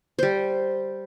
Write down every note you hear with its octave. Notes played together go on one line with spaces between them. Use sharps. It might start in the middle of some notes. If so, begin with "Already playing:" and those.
G3 C5